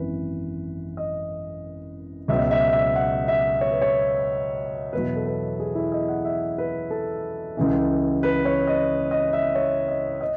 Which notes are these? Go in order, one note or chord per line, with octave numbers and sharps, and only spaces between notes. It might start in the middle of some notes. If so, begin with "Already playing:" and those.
Already playing: G#1 F#2 E3 B4
D#5
C#2 B2 F#3 E5
E5
E5
F#5
E5
C#5
B4
C#5
E2 B2 F#3 B4
A4
B4
G#4
E4
D#5
F#5
E5
B4
A4
C#2 C#3 E3
B4
C#5
D#5
D#5
E5
C#5
D#5
D#5